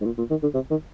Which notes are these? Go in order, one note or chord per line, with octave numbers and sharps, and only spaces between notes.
G#2
A#2
A#2
D#3
D3
C3
D#3